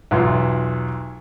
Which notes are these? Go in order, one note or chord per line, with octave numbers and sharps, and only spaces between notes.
B1 E2 F4